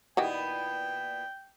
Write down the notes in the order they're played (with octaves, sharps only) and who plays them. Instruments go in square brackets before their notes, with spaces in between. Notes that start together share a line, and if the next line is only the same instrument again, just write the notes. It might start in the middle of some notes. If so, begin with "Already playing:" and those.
[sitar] A#2 B3 E4 [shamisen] D#3 F#4 G4 [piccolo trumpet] G5